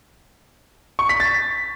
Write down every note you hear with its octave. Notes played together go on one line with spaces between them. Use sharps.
C#6
B6
A6